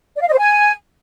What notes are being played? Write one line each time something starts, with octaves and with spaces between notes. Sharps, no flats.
D5
F5
D#5
C5
G#5